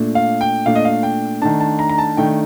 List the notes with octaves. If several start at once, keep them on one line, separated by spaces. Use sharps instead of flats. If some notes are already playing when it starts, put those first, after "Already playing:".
Already playing: A#2 A3 D4
F5
G5
A#2 A3 D4 F5
D#5
F5
G5
D#3 A3 D4 A5
A5
A#5
A#5
A5
D#3 A3 D4 G5